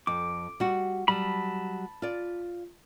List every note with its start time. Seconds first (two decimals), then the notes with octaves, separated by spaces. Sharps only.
0.07 F2 D6
0.60 G3 F#4
1.08 F#3 G3 A5 B5
2.02 F4 D5